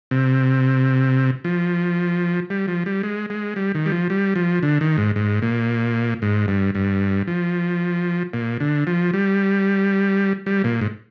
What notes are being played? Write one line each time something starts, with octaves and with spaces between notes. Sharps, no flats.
C3
F3
G3
F3
G3
G#3
G#3
G3
D#3
G3
F3
G3
F3
D3
D#3
G#2
G#2
A#2
G#2
G2
G2
F3
A#2
D3
F3
G3
G3
A#2
G#2